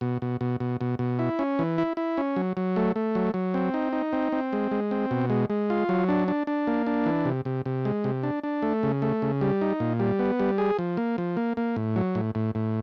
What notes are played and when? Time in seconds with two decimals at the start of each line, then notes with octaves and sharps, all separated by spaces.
0.01 B2
0.22 B2
0.41 B2
0.60 B2
0.81 B2
0.99 B2
1.19 E4
1.39 C#4
1.59 E3
1.78 E4
1.97 E4
2.17 C#4
2.36 F#3
2.57 F#3
2.76 A3
2.96 A3
3.15 F#3
3.34 F#3
3.54 C4
3.74 D#4
3.93 D#4
4.13 C4
4.32 C4
4.53 G#3
4.72 G#3
4.91 C4
5.11 B2
5.30 G#3
5.50 G#3
5.70 F4
5.89 F#3
6.09 D4
6.28 D4
6.47 D4
6.67 A#3
6.87 D4
7.06 E3
7.25 C3
7.45 C3
7.66 C3
7.85 G#3
8.04 C3
8.23 D4
8.44 D4
8.62 A3
8.83 C#3
9.02 A3
9.22 C#3
9.41 G3
9.61 D#4
9.80 A#2
10.00 G3
10.19 B3
10.39 G3
10.58 G#4
10.79 F3
10.97 A#3
11.18 F3
11.37 A#3
11.57 A#3
11.76 A2
11.96 F#3
12.15 A2
12.35 A2
12.55 A2